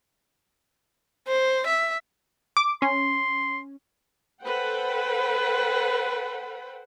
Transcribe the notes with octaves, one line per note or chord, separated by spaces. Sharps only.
C5
E5
D6
C#4 C6
A4 B4 C5 F#5 G5